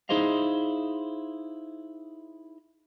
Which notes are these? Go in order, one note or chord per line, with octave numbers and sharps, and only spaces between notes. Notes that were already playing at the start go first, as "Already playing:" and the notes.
D#4 E4 G#4 C5 D#5 F5